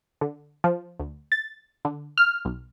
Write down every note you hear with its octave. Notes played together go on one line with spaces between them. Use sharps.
D3
F3
D2
A6
D3
F6
B1